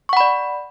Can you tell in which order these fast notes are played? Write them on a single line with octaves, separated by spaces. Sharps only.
C#6 F#5 B5 D5